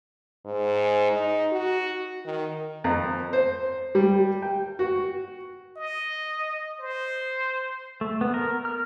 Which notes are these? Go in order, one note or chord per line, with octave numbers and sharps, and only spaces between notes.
G#2
D#4
F#4
D#3
F2
C5
G3
G5
F#4
D#5
C5
A3
B3
A#4
F6